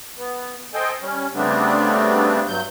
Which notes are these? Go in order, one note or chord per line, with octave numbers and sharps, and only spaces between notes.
B3
A4 C5 D#5 G5 G#5
G3 C#4
C#3 G3 A3 B3 C4 D4
G2 F#3 G6